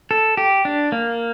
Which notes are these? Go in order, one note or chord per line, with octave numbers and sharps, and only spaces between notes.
A4
G4
D4
A#3